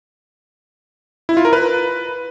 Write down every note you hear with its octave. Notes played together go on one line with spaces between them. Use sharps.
E4
F4
A#4
B4